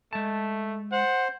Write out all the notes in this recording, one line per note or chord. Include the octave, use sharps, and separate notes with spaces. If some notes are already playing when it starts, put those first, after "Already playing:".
G#3 A3 A5
C5 F#5